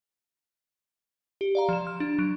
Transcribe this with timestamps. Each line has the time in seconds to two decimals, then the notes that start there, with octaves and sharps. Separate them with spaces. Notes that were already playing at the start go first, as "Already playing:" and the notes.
1.41 G4
1.55 D5 F5 A#5
1.69 F3 E7
1.87 F6
2.00 D4
2.19 F#3 D7